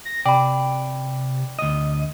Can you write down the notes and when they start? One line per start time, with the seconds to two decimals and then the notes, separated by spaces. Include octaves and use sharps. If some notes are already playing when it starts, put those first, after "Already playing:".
0.05 A#6
0.26 C3 D5 G5 B5
1.59 D2 D#5